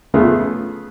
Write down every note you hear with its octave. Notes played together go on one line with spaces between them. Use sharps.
C#3 F3 A3 B3 F4 G#4